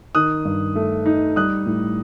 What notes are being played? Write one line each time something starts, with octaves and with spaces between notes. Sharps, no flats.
D#3 D#6 F#6
G2
A3
D#4
G3 D#6 F#6
A2